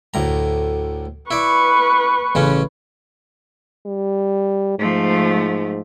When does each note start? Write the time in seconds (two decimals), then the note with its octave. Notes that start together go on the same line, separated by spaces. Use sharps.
0.14 D2 A2 A#5
1.31 E4 B4 D5 C#6
2.35 A1 C#3 C#4
3.86 G3
4.79 G#2 F3 A3